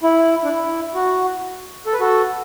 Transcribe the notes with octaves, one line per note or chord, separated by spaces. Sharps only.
E4
D4
E4
F#4
A4
B4
F#4 A4